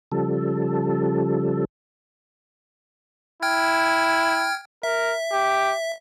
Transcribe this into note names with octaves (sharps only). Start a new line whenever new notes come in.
C#3 F3 G3 A4
E4 G5 F6 G#6
A#4 E5
G4